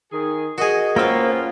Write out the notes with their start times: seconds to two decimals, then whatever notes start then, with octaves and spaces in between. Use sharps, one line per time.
0.12 D#3 G#4
0.58 F#4 G#4 A#4 D#5
0.96 A#3 B3 C#4 F4 C5 G5 E6